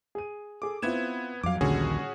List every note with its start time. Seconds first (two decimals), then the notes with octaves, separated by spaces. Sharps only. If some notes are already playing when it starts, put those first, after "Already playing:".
0.15 G#4 D#7
0.62 G#4 A4 D6
0.82 B3 C4 E4 F4 G#6 E7
1.43 F2 F#3 F5 D6
1.61 A#1 D#2 D3 G3 C#4 F#4 G#4